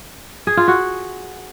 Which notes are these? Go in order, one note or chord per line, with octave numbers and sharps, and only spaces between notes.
G#4
F4
F#4